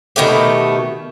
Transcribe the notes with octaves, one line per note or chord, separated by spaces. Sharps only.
B2 D#3 A3 G4